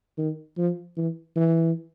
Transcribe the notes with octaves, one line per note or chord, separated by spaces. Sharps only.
D#3
F3
E3
E3